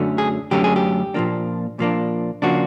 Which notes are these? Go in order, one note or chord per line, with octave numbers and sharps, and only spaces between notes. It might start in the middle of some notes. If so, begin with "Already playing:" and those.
Already playing: F#2 D3 F#3 A3 C#4
G#4
F#2 D3 F#3 A3 C#4 G4
G#4
G4
A#2 F3 A#3 D4
A#2 F3 A#3 D4
C#3 F3 A#3 D4 F#4